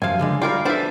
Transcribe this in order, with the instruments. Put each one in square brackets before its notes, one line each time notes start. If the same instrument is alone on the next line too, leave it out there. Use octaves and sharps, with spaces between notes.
[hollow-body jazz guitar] F#2 F3 [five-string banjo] F5 G#5
[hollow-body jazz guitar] C#2 D3 G#3
[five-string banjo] G3 A#4 F5 [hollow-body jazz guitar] F4
[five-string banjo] E3 A4 C5 [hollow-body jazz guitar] D4 E5